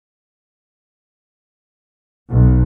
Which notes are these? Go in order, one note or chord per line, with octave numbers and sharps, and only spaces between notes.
B1